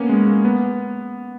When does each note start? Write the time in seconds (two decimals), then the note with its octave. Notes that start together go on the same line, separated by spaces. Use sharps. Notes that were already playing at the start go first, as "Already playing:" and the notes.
Already playing: A#3 B3 C#4
0.09 G#3
0.27 A#3
0.45 B3